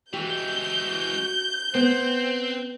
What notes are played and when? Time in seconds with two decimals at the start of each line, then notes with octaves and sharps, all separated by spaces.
0.13 E3 G#3 F#4 G4 G6
1.75 B3 C4 C5